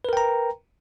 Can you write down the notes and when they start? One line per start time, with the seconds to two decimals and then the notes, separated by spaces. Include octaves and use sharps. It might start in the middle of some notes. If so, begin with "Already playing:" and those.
0.05 B4
0.09 A#4
0.13 G5
0.17 A#5